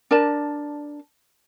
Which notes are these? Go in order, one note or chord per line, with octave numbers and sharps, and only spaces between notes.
D4 A#4 D5 A5